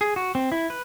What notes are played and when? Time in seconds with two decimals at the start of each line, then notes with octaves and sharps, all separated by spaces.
0.01 G#4
0.16 F#4
0.35 C4
0.52 E4
0.70 B4